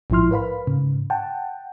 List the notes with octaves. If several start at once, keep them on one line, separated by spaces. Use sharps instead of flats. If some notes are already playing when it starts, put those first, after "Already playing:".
A#1 G#2 F3 E4 C6 F6
A#4 B4 F5 B5
G#2 C#3
F#5 G5 A5